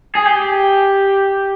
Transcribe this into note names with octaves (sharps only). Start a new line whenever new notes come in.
G#4
G4